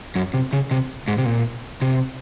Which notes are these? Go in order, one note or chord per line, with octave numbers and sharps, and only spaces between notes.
F#2
C3
C#3
C3
G#2
C3
A#2
C3